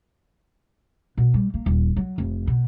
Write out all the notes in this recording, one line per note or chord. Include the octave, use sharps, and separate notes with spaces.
B2
G3
A#3
D#1
F#3
F1
B2